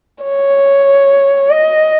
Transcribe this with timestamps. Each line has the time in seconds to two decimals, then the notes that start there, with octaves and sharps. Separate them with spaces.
0.24 C#5
1.51 D#5